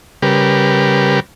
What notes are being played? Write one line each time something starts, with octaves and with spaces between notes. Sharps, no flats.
C#3 G3 G4 A#4 B4